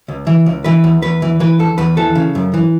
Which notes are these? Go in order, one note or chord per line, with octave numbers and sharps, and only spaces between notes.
C#2
E3
C#2
E3 B4
E2
E2 B4
E3
E3 B4
E2 A4
E2 B4
E3 A4
C#3
F#2
E3